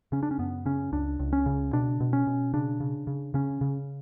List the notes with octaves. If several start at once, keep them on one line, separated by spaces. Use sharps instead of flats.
C#3 C#4
D4
C#4
F#2 B3
C#3 C#4
C#2 D4
C#2
C#4
C#3
B2 D4
B2
C#4
B2
C#3 D4
C#3
C#3
C#3 C#4
C#3